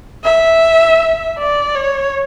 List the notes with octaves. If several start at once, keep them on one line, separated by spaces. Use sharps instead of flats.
E5
D5
C#5